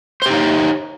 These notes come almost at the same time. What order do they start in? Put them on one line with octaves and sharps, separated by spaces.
C5 G4 D#4 C#5